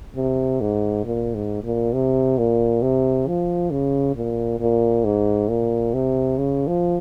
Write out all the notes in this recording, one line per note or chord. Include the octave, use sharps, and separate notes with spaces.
C3
G#2
A#2
G#2
A#2
C3
A#2
C3
F3
C#3
A#2
A#2
G#2
A#2
C3
C#3
F3